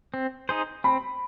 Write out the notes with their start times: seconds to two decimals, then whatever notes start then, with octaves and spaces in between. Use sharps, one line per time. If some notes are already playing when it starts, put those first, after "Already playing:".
0.14 C4
0.49 D#4 G#4 C5
0.84 C4 B5